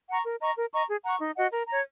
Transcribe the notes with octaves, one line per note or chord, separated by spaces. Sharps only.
F#5 A#5 C#6
A#4
D#5 A#5 C#6
A#4
D#5 A#5 C#6
G#4
F#5 A#5 C#6
D#4
F#4 D#5 F#5
A#4
C#5 A#5